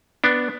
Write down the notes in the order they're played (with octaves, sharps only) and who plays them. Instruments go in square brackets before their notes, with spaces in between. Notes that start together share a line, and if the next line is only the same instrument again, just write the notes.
[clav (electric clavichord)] B3 D4